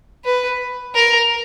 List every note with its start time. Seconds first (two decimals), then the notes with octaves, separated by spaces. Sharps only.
0.25 B4
0.95 A#4